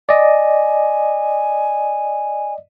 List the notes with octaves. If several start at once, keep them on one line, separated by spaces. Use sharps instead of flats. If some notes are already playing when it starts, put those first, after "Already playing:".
D5 D#5 G#5